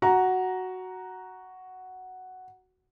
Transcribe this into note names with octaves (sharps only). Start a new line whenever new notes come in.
F#4 A#5